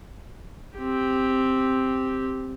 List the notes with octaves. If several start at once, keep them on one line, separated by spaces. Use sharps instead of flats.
C4 G4